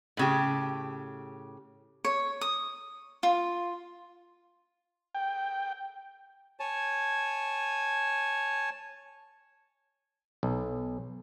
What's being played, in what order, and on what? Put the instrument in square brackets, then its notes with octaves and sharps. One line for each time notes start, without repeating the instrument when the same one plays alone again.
[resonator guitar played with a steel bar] A2 C#3 G4
[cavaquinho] C#5
D#6
F4
[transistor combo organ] G5
[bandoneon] C#5 G#5 A5
[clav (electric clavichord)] B1